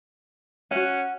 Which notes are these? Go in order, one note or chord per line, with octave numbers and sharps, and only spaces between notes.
C#4 F#4 F#5